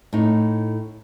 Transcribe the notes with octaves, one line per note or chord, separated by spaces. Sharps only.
A2 D#4